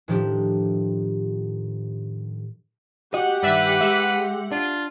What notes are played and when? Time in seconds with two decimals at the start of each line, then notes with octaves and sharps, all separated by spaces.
0.08 A2 D#3 F3 D4 G4
3.14 F#4 G4 D#5 F#5
3.43 G2 D#3 B4 D5 E5 B6
3.81 G#3 E5
4.52 D4 F4